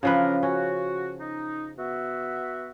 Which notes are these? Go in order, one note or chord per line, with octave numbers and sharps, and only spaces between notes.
C#3 E3 F3 D4 A#4 B4
C#4 F#4
D#4
B3 F#4 E5